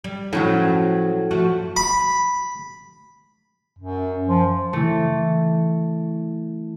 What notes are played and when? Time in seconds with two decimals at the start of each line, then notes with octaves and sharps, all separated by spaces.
0.04 G3
0.33 A2 F3 F#3 C#4
1.31 F3 A3 F#4
1.77 B5
3.79 F#2
4.27 F3
4.73 E3 A3